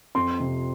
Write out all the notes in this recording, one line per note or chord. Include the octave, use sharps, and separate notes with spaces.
F2 C6
C3